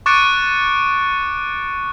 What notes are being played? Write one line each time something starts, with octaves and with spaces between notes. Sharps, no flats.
C#6 D6 F#6 A6 C#7 D7